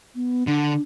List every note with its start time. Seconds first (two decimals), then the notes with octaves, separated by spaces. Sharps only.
0.15 B3
0.47 D3 D4